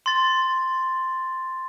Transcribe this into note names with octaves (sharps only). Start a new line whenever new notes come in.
C6 A6